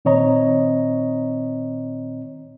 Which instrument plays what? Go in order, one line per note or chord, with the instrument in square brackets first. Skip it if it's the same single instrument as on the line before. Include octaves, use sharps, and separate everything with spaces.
[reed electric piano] A#2 D#3 C4 C#5 D#5 A#5